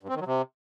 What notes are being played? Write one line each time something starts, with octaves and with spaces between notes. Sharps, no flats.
G2
C4
D#3
F#3
C3